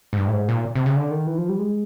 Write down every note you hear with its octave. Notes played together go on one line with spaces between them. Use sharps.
G#2
G2
A2
G#2
A#2
C3
C#3
D3
D#3
E3
F3
G3
G#3